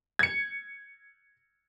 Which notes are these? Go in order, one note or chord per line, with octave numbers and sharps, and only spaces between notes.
G#6 C#7